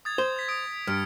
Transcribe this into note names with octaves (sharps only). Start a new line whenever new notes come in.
D#6 G#6 A6
C5
G#6 B6
D#6 D7
G2 F6 C#7 D7